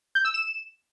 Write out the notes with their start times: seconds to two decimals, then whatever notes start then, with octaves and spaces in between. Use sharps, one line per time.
0.15 G6
0.25 E6
0.34 E7